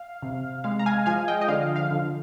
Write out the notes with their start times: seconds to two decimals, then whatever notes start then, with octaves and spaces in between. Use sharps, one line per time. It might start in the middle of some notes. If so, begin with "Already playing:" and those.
Already playing: F5
0.22 C3
0.64 G#3 F5
0.79 A#5
0.86 F5 G#5
1.06 F3 F5 G#5
1.28 D#5 G5
1.41 D#5
1.48 D3 F5
1.76 F5
1.91 D3